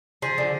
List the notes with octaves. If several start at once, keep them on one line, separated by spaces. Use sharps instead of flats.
F3 G#4
D3